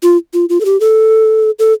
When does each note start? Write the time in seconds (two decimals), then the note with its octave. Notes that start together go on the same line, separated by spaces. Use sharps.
0.03 F4
0.34 F4
0.49 F4
0.60 A4
0.65 G4
0.80 A4
1.59 A4